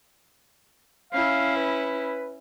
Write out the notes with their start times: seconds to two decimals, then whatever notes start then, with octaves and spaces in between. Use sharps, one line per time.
1.13 C#4 E4 F5
1.56 B4